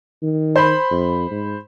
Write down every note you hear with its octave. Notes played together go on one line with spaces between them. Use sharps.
D#3
C5 B5
F2
G#2